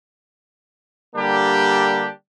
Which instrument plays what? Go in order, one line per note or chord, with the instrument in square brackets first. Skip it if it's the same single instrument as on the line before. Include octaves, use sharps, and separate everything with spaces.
[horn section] D3 G3 A#3 D4 G4